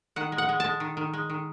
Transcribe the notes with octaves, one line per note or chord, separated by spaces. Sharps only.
D#3 F#5
G#3
F#5
G#3
G#3 A5
D#3
D#3
G#3
D#3